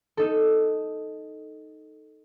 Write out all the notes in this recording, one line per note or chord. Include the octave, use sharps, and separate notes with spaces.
D#4 A4